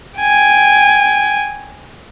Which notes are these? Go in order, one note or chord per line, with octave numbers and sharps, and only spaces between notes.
G5 G#5